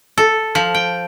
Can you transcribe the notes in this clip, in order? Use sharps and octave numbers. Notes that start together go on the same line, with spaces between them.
A4
F3
G5